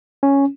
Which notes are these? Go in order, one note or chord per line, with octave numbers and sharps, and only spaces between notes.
C#4